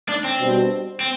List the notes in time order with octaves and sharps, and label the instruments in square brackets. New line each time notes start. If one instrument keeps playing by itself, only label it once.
[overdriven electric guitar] D4
C4
[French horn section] B2 G3 D4 F#4 C5
[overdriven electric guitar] C4